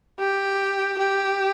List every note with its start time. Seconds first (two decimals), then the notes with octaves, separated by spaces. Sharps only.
0.19 G4
0.99 G4